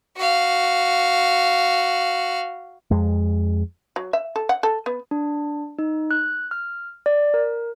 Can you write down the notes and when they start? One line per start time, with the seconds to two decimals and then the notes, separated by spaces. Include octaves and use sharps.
0.17 F#4 F5
2.91 F2 G#3
3.96 F#3
4.13 E5
4.36 A4
4.49 F#5
4.63 A4
4.86 B3
5.11 D4
5.79 D#4
6.11 F#6
6.51 F6
7.06 D5
7.34 A#4